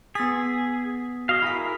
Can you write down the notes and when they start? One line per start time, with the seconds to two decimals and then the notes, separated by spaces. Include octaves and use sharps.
0.15 B3 G#4 A6 B6
1.29 F#4 D#5 F5
1.42 E4 G#4 A#4 F5 B6